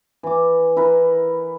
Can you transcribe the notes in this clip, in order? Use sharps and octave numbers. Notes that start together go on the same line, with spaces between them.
E3 D6
E4 A#4 B4